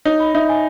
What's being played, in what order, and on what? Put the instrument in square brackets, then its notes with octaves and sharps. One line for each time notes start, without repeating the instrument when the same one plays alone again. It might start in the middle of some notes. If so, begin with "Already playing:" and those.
[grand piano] D#4 [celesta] C#5
[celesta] B5
[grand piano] D#4 [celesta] E5
[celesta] G#5